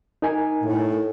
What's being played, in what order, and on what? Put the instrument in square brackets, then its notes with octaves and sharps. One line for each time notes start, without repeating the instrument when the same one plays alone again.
[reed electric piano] D#4 A#4 G#5
[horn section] A2